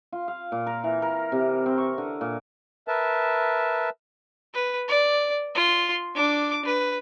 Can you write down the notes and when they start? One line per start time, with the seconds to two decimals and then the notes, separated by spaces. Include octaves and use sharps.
0.12 F4
0.28 F5
0.52 A#2
0.67 A#4
0.84 E3
1.02 A#4
1.32 C3
1.66 C4
1.78 C#6
1.98 D3
2.21 A#2
2.88 A#4 B4 E5 A5
4.54 B4
4.88 D5
5.55 F4 C6
6.15 D4 D6
6.65 B4